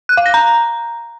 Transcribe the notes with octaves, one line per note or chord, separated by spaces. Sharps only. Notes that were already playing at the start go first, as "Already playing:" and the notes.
F#6
F5
A#6
A#5